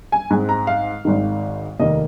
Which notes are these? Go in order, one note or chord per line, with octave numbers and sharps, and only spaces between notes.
G#5
G#2 G#3 C4
A#5
F5
G#1 G#2 D#3
F1 D#2 D#3 A#3 D#5